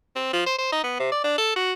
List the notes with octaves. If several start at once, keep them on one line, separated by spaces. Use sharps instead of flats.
C4
F3
C5
C5
D#4
B3
C3
D5
D4
A4
F#4